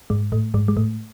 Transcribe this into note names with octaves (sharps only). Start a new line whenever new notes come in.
G#2 G#3
A2 A3
G#2 G#3
G#3
A2 A3